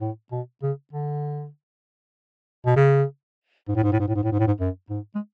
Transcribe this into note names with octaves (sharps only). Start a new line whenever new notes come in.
A2
B2
C#3
D3
B2
C#3
G#2
A2
G#2
A2
G#2
A2
G#2
A2
G#2
A2
G#2
F#2
G#2
G#3